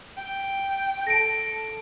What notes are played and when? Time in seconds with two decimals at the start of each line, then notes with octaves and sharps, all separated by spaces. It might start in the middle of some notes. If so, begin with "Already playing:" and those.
0.17 G5
1.07 A4 A#6 D7